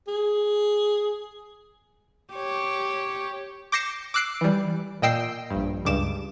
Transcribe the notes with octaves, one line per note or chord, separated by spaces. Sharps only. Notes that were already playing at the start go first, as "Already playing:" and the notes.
G#4
G4 C#5
D6 G6 A#6 C7 C#7 E7
D6 E6 F#6 C7 D7
E3 G3
A#2 D#5 G5 E6 C7
A#1 G2
C#2 G2 D6 E7